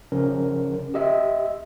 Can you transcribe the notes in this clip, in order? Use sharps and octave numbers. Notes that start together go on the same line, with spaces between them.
C#3 F3 C#4 A#4
G4 D#5 E5